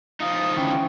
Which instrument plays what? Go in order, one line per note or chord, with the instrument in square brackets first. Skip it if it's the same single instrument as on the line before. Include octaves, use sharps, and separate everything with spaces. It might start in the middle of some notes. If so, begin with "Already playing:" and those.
[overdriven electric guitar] F3 D#4 [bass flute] F5 [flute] D#6
[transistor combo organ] D3 E3 C#5 [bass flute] C#4 [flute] G5